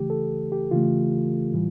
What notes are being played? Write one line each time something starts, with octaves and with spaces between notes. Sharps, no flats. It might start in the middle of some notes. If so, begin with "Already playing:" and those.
Already playing: C#3 E3 A3 G4
A4
G4
C#3 E3 A3 F4
A2 E3 G3